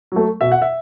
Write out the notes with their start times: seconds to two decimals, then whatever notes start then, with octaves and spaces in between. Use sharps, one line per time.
0.12 F#3 A3
0.41 B2 E5
0.51 F#5
0.62 E5